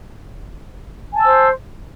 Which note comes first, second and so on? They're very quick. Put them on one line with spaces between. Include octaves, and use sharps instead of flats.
G#5 A5 E6 C5